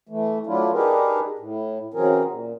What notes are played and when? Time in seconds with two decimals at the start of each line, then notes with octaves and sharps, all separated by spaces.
0.09 E3 A3
0.47 F#3 A3 D4 E4 F4
0.72 D4 D#4 G4 G#4 A#4 B4
1.39 A2
1.94 C#3 E3 F#3 C4 G#4 A#4
2.28 A#2